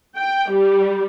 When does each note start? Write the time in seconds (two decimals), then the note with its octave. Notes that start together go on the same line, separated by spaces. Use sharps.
0.15 G5
0.49 G3